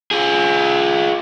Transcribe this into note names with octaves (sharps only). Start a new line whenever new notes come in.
F4 G#4